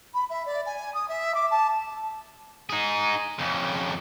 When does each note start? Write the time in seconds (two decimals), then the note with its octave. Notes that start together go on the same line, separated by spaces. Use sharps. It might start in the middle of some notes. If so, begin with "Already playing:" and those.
0.14 B5
0.30 E5
0.46 D5
0.66 G#5
0.94 D#6
1.08 E5
1.34 D6
1.51 A5
2.70 D#4 G#4
3.39 F2 C#3